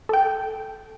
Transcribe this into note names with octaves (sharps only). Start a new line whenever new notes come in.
A4 G5